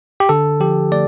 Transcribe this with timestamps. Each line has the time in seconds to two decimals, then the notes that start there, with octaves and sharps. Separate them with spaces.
0.20 G4
0.29 D3 A4
0.60 F3 G4
0.92 A3 D5